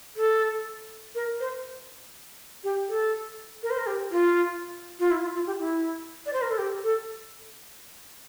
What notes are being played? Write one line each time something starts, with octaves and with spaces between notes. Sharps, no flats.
A4
A#4
C5
G4
A4
A#4
C5
A#4
G4
F4
F4
E4
F4
F4
G4
E4
D5
C5
A#4
A4
G4
A4